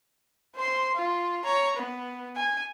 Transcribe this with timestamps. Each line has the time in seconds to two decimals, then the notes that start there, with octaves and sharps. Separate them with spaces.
0.55 C5 C6
0.95 F4
1.44 C#5 A#5
1.77 B3
2.36 G#5